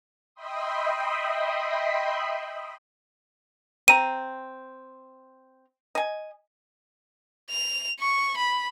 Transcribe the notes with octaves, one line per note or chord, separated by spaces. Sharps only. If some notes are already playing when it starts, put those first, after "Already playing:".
D#5 E5 G5 B5 C6 D#6
C4 A#5 D#7
D#5 G#5
F7
C#6
B5